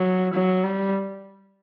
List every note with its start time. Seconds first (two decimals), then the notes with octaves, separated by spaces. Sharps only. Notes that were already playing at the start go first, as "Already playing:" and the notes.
Already playing: F#3
0.34 F#3
0.64 G3